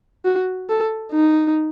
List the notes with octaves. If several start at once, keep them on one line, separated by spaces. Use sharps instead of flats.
F#4
A4
D#4